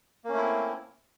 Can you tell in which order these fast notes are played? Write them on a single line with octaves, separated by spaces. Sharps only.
A#3 C#4 A3 E4 C4